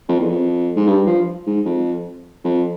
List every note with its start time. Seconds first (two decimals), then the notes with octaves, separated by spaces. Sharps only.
0.09 F2
0.20 E2
0.30 F2
0.76 G#2
0.87 G2
1.06 F3
1.47 G#2
1.65 F2
2.44 F2